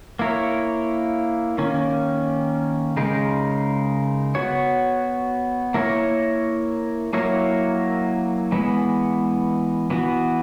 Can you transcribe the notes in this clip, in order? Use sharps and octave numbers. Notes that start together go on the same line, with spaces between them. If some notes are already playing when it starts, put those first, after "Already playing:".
A#3 E4 A#4 C#5
D#3 A#3 C#4
C#3 G#3 D#4 A#4
B3 F#4 C#5
A#3 E4 A#4 C#5
F#3 A#3 E4 A#4 C#5
E3 G#3 B3
E3 B3 F#4